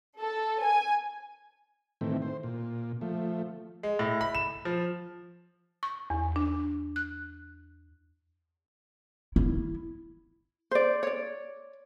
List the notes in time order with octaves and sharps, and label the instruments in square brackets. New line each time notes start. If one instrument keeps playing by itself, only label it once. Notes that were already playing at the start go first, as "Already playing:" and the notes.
[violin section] A4
G#5
[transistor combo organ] A2 D#3 E3 A3 C4
C5
A#2
F3 A3
[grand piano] G#3
A2
B5
E7
F3
[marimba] C#6
E2
D4
F#6
[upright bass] E4
[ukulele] C5 D5
C#5 D5